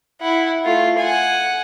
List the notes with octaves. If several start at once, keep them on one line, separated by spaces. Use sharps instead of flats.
E4 F#5
A3 F4
F#5 G#5